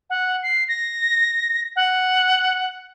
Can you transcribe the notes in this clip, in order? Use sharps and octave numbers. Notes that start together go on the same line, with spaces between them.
F#5
C7
A#6
F#5